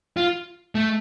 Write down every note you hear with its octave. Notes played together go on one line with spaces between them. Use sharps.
F4
A3